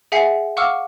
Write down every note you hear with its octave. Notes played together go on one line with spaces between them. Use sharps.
G#4 E5 F#5 G#5 B6 C7
F5 F#5 C#6 D6 E6 F6